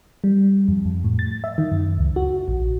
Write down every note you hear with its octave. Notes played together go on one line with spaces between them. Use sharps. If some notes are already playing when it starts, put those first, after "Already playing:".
G3
F2
F2
A2
A6
E5
D#3
F#2
C#2
F#4
A#1